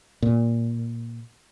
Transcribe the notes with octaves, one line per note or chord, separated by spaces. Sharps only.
A#2